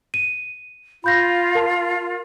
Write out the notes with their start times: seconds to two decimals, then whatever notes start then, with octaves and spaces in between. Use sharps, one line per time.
0.14 D#7
1.04 F4 B5 G6 A#6
1.55 A#4 A5